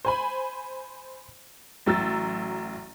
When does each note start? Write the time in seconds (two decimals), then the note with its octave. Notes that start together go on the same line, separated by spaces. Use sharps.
0.05 C5 G#5 B5
1.86 A1 F#3 E6 A6